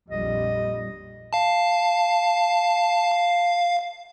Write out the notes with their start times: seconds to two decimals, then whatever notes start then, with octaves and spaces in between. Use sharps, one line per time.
0.10 A#1 F2 G3 D#5
1.33 F5 A5
3.12 F5